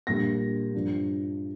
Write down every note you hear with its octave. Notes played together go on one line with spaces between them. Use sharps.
A#1 A#2 G3 A#3 D4 A#6
G2 F3 D4